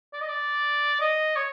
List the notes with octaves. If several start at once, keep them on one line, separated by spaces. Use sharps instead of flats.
D5
D#5
D5
D#5
C#5